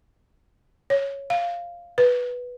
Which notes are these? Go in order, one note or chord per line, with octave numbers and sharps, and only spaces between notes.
C#5
F5
B4